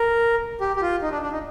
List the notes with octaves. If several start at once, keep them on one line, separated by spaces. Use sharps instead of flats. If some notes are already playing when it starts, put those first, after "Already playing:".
Already playing: A#4
G4
G4
F4
D#4
D4
D4
D#4